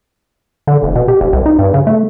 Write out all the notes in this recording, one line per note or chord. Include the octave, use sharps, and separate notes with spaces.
D3
F1
B2
G4
F1
C2
D#4
G2
C#3
A3